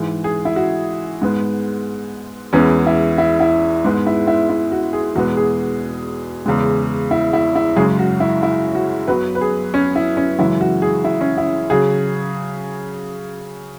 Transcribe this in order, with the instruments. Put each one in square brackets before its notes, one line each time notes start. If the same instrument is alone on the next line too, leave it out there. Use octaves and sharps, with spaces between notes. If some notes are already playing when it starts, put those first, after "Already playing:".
Already playing: [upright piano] G#2 E3 G#3
G#4
E4
F#4
G#2 G#3 B3
E2 E3 G#3 B3 C#4
E4
E4
E4
G#2 G#3 B3
E4
E4
E4
F#4
G#4
E2 B2 G#3 B3 F#4
G#4
E2 C#3 G#3
E4
E4
E4
F#2 C#3 G#3 G#4
F#4
E4
E4
F#4
F#2 F#3 B3 B4
B4
G#4
C#4
E4
C#4
F#2 C#3 E3 G#3 E4
F#4
G#4
E4
C#4
E4
C#3 F#3 G#4